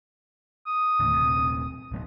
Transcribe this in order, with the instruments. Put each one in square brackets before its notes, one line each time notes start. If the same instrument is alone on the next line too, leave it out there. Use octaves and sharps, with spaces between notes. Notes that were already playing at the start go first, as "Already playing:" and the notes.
[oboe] D#6
[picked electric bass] D#2 A2 D3
D#1 C3
D1 F#3 B3